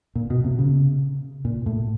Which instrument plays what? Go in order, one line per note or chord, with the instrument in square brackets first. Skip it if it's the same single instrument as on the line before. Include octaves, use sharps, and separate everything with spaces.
[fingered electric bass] A#2
B2
C3
C#3
A#2
A2